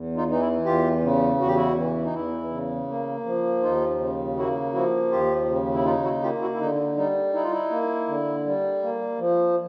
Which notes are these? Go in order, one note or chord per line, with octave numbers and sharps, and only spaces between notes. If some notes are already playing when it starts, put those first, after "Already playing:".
Already playing: E2
D#4 F4
E3 D#4
E4
E2 F4 G4
C#3
E2 F#4
G4
E4 F#4
E3
D#4
E2 E4
C#3
A#3
F3
D#2 D#4 F4
C#3
A#3 E4 F#4
F3 E4 F#4
D#2 F4 G4
C#3
E4
D#4 F4
E4 F#4
A#3 F4 G4
E4 F#4
E4
D3 D#4
G3 D#4
D#4 E4
F4
E4
A#3
D3
G3
A#3
F3